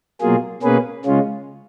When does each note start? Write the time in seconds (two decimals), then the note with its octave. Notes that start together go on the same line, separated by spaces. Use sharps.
0.21 B2 F#3 A#3 F4 G#4
0.62 B2 A#3 C#4 G#4 B4
1.05 C#3 G#3 C#4 F4